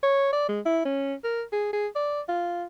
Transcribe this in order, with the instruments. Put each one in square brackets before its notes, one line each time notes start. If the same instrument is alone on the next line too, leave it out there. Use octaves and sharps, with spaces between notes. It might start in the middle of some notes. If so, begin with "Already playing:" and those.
[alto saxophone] C#5
D5
G#3
E4
C#4
A#4
G#4
G#4
D5
F4